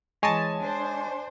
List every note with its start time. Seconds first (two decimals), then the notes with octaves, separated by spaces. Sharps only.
0.23 E3 G#3 C#5 D#5 G#5 A5
0.60 D4 C5